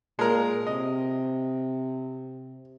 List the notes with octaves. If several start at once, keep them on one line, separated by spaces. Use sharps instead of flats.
A#2 G#3 A#4
C3 D#5